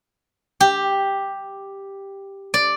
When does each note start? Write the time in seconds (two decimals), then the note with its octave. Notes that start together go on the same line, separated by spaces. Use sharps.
0.60 G4
2.54 D5